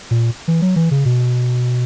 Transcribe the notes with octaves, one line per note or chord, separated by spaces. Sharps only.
A#2
E3
F#3
E3
C#3
B2